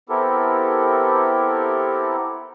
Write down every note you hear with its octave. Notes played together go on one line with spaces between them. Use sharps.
B3 C4 E4 G4 A4 A#4